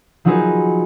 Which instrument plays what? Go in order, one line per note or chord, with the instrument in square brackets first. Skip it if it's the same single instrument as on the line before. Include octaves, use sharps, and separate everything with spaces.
[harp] F3 F#3 D#4 F#4 G#4 B4